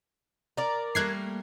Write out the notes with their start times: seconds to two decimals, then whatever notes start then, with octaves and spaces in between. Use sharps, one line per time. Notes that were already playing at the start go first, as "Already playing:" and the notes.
0.57 A#4 D5
0.95 G3 A3 A#3 F#6 G#6 C7